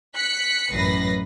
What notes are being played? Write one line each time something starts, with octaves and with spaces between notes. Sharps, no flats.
F#6 B6 C#7
A1 F#2 B4 A#6 C7